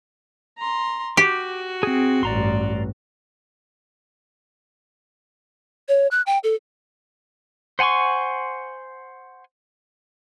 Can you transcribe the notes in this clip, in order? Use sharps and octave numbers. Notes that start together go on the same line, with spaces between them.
A#5 C6
F#4 G4 D6
C4 G#4
A1 G2 D5 A#5 C6
C#5
F#6
G5
A4
C5 F#5 G#5 C6 C#6